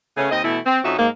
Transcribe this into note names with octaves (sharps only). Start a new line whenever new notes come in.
C#3 A3 B3 C#4 G#4
D#2 C4 D#5
B2 E3 A3 E4
C4
F2 C#4 D#4 F#4 E5
G#2 G#3 A#3